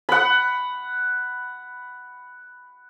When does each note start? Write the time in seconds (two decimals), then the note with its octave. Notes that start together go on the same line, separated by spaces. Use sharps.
0.09 F#5 B5